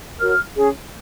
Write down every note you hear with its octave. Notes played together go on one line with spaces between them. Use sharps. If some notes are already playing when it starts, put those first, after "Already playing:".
F#4 A#4 C#5 F6
C#4 G#4 C#5